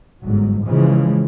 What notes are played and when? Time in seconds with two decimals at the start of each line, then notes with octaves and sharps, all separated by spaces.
0.24 G1 G#2 F#3
0.65 C#3 E3 F3 G#3